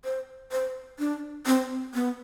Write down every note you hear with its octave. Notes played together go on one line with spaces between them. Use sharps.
C5
C5
D4
C4
B3